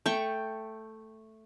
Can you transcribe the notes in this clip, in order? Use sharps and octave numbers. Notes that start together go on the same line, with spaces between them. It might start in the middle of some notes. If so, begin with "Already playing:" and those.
A3 G5 C#6